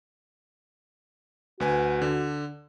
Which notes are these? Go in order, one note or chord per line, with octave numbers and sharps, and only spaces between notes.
D2 F#4 B4 G#5
D3